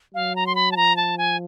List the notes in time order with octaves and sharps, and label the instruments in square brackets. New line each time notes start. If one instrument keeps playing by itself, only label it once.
[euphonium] F#3 [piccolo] F5
[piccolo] A#5
C6
B5
A5
[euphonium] F3 [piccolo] A#5
[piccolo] A5
G#5